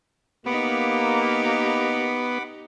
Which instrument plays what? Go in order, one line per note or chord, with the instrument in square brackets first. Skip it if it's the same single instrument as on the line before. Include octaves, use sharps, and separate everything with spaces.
[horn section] A#3 [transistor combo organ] B3 [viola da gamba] D#4 G4 [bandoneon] F#5 B5 D6